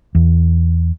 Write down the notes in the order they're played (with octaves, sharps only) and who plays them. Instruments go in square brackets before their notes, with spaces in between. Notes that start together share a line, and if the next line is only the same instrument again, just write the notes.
[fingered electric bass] E2